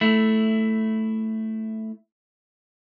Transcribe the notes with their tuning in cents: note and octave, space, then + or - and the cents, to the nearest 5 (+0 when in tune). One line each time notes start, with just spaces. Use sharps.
A3 +0 E4 +0